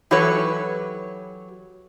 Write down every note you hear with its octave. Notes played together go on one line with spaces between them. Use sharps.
E3 F#3 G4 A4 B4 C#5